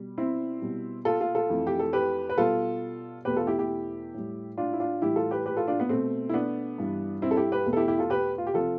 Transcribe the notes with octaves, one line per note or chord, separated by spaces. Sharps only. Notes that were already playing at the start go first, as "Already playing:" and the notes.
Already playing: B2 G3
C4 E4
B2 G3
F4 A4
F4 A4
F4 A4
F2 E3 A3
G4
A4
G4 B4
B4
B2 G3 F4 A4
E2 B2 A3 G4 B4
F4 A4
E4 G4
E4 G4
A2 G3
D4 F4
E4
D4 F4
A2 E3 G3 E4 G4
F4 A4
G4 B4
G4 B4
F4 A4
D4 F4
B3
B2 A3 C4
E4
B3 D4
G2 E3 G3
C4 E4
A4
E4 G4
G4 B4
E2 B2 A3
A4
E4 G4
E4 G4
F4 A4
G4 B4
F4
G4
C3 F3 F4 A4